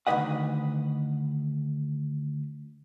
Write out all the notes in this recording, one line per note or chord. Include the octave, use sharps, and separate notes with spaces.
D2 D#3 G3 B4 D#5 F#5